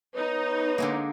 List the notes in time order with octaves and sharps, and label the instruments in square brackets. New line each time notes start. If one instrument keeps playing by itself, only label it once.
[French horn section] B3 B4 C#5 [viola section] D#4
[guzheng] D3 G#3 A#3